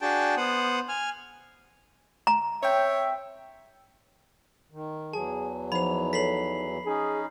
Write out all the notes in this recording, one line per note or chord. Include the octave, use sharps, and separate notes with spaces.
D4 F#4 G#4 G5 A5
B3 C5 F#5 D#6
G#5 F6
A#5
C4 C#5 E5 G5
D#3
E2 E3 F#3 G#4 A5
F3 D#4 C5 B5 F7
A4 B4 C#5 B6 C7 F#7
C#4 D#4 G#4